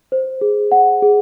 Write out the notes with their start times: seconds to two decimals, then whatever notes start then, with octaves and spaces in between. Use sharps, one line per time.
0.12 C5
0.41 G#4
0.72 F#5
1.02 G#4